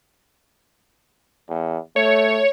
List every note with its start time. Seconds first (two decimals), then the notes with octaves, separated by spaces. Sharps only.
1.49 E2
1.96 A3 C#5